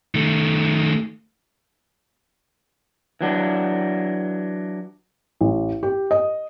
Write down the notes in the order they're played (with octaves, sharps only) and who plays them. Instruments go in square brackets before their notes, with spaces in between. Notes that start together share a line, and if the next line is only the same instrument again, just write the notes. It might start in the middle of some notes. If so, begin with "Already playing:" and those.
[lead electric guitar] D#3 A3
[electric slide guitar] E3 F#3 D4
[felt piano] A1
G4
D#5